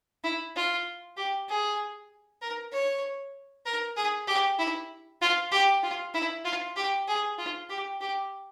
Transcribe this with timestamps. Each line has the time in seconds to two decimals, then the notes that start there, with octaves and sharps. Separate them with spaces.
0.24 E4
0.56 F4
1.17 G4
1.49 G#4
2.42 A#4
2.72 C#5
3.66 A#4
3.96 G#4
4.27 G4
4.59 E4
5.21 F4
5.51 G4
5.83 F4
6.14 E4
6.44 F4
6.76 G4
7.08 G#4
7.38 F4
7.69 G4
8.01 G4